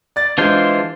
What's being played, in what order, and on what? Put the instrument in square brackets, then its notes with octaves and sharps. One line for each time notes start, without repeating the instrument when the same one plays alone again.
[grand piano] D5 A6
[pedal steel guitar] E3 F4 C5 [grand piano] G#3 D4